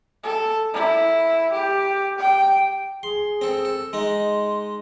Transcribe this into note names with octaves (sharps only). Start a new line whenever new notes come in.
A4
E4
G4
G5
G#4 C6
C4 A4
A4
G#3 D#4 C6